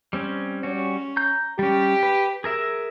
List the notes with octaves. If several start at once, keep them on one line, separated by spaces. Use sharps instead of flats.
G3 C4 C#4
G3 C#4 F#4
A#5 G6
G3 C#4 G4
B4
G#4 A#4 E5